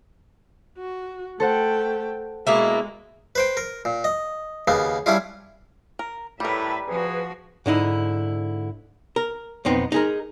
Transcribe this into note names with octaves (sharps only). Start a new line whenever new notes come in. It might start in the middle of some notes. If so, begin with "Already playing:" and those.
F#4
A3 A4 C5 F#5 G5
B2 G#3 A#3 E4
B4 C5 G5
A#4
A#2
D#5
D#2 C#3 A#3 B3
G3 C#4 D4 E4 F4
A#4
A2 G3 A#4 B4 E5
F3 F#4 G#4 B4
G#2 D3 D#4 E4
A#4
B1 F2 B3 C4 D#4
D#4 G#4 A#4